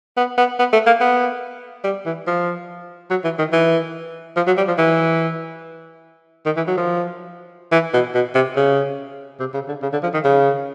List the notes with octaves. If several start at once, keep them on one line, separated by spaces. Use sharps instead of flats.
B3
B3
B3
A3
A#3
B3
G3
E3
F3
F#3
E3
D#3
E3
F3
F#3
G3
F3
E3
D#3
E3
F#3
F3
E3
B2
B2
C3
C#3
C3
C#3
D3
C#3
D3
F3
D#3
C#3